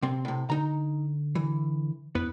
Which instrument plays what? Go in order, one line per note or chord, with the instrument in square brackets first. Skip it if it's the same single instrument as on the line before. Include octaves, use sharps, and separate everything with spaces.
[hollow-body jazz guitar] C3 C4
A2 C3
[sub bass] D3 [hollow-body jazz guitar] D#4 A#5
[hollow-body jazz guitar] E3
[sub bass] F2 [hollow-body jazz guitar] B3 E4 B4